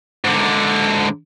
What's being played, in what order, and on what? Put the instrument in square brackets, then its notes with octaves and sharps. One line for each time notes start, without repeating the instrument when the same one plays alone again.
[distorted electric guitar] G#2 D3